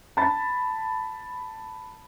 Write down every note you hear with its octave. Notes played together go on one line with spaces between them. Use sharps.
A5 B5 A6